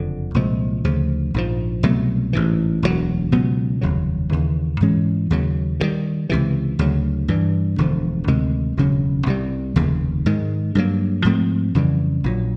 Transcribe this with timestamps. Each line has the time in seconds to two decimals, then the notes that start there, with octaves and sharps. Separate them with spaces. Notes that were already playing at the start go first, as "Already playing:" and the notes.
Already playing: F#1 F2 D3
0.34 C2 A#2 F3 G#3
0.84 D2 C#3 F3
1.34 A#1 G#2 F3
1.83 C2 B2 F#3 A3
2.33 A1 G#2 E3
2.83 E1 D2 C#3 F#3
3.32 C#2 B2 F#3 B3
3.81 F1 D#2 C#3 F#3
4.31 D#2 C#3 E3
4.81 G#2 E3 G#3 C#4
5.30 D#2 C#3 F#3
5.80 G2 D#3 G3
6.29 C#2 C3 E3
6.79 D2 C#3 F#3
7.28 G2 E3 G3
7.78 E1 D2 D3 F3
8.28 D2 C3 D#3 G#3
8.77 E1 D2 C#3 F#3
9.26 C2 C3 E3 G3
9.76 F1 D#2 C#3
10.26 G#2 D#3 G#3
10.75 G2 D3 F#3 A#3
11.24 G#2 F3 A3 C4
11.75 F2 C#3 E3 G3
12.24 A#1 A#2 F#3